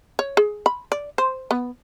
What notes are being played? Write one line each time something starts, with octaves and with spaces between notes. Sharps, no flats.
C#5
G#4
B5
D5
C5
B3